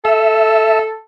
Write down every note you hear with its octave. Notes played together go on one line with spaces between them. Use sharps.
A4 E5